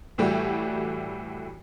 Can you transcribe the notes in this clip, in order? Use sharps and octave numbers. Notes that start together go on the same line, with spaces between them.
A2 E3 G3 A3 F#4 G4